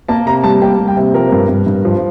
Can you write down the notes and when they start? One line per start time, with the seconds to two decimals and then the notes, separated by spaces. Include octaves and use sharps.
0.08 A#3 A5
0.26 C3 A#5
0.44 G3 A5
0.62 A#3 G5
0.79 G3
0.88 G5
0.96 C3
1.14 F3 A#4
1.32 G2
1.49 G2
1.67 G2
1.85 F3